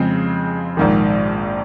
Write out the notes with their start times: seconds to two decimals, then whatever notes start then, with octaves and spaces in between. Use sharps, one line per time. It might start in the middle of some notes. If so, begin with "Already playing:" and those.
Already playing: F2 C#3 G#3 C4
0.77 A#1 G#2 D#3